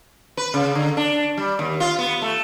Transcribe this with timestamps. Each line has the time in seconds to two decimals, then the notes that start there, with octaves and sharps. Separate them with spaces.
0.37 B4
0.54 C#3
0.75 D3
0.97 D4
1.37 G3
1.59 D#2
1.80 F4
1.99 B3
2.22 A3